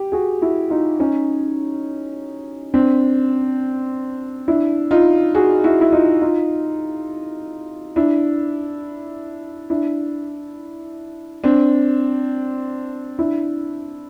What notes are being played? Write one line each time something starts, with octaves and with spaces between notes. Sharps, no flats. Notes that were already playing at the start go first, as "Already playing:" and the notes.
Already playing: G4
F#4 G#4
E4 F#4
D#4 F4
C#4 D#4
C4 D4
D4 E4
D#4 F4
F#4 G#4
E4 F#4
E4
D#4 F4
D#4 F4
D4 E4
D4 E4
C4 D4
D4 E4